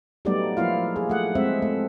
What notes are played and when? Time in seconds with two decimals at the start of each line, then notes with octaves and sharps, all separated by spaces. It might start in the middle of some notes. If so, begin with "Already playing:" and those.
0.25 F#3 G3 A3 B3 D#4 D5
0.57 F3 A#3 E4 F4 F5
0.96 G#4
1.10 A3 F#5
1.35 G#3 C4 E5
1.62 A3